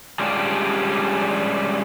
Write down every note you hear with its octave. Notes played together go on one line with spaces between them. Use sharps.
G3 G#3 C#4 D4 F4 G4